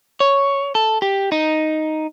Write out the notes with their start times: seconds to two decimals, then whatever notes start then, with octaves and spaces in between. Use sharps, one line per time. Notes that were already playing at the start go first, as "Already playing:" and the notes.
0.20 C#5
0.75 A4
1.02 G4
1.32 D#4